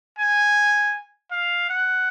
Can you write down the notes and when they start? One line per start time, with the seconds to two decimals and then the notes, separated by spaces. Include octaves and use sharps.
0.19 G#5
1.32 F5
1.70 F#5